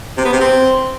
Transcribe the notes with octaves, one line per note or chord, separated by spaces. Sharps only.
C3
B3
C3
C4